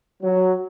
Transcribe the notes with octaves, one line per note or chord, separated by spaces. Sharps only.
F#3